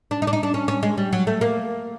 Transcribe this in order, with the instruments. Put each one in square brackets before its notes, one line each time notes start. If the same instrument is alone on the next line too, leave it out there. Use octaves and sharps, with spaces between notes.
[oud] D4
D#4
D4
D#4
D4
C#4
C#4
G#3
G3
F#3
A3
A#3